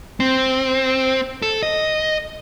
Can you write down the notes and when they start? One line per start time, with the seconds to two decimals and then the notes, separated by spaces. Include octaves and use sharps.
0.20 C4
1.42 A4
1.63 D#5